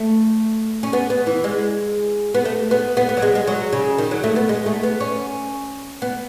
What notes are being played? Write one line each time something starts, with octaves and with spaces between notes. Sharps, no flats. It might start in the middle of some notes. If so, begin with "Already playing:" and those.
Already playing: A3
C#4
B3
B3
E3
G#3
B3
A3
B3
B3
B3
F#3
G#3
G#3
F#3
C#3
D#3
F#3
A3
B3
G#3
A3
B3
C#4
B3